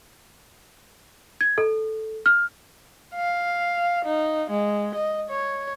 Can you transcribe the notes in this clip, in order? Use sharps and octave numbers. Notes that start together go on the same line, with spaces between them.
G#6
A4
F6
F5
D#4
G#3
D#5
C#5